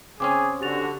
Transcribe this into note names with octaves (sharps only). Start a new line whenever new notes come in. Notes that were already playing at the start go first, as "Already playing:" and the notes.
C#3 C4 C#4 G#4 D6
D3 F#4 G4 A6 F7